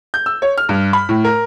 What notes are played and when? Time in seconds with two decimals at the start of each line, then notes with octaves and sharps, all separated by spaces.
0.14 G6
0.26 E6
0.42 C#5
0.58 F6
0.69 G2
0.93 B5
1.09 A2
1.24 A#4